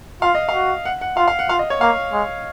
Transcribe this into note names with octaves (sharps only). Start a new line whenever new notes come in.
F4 F5
D#5
F5
F#4
F#5
F#5
F4 F5
F5
F#5
F4 F5
D#5
C#5
A#3 F5
G#3